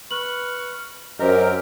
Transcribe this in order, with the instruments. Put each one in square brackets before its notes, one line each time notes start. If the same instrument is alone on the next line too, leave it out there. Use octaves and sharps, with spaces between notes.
[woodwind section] B4 C#6 F6 [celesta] F#7
[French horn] F#2 [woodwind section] C4 G4 A#4 [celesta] C5 D#5